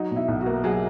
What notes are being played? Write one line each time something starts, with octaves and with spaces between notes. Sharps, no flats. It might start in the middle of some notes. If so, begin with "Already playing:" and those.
Already playing: F#3 D#4
B2
E4
B1
F#4
A#3
F#3 G#4